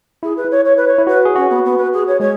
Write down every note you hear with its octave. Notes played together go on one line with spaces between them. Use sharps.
E4 G#4
B4
E4
C#5
C#5
B4
C#5
E4
F#4 B4
G#4
C#4 F#4
B3
B3
B4
G#4
C#5
G#3 G#4 C#5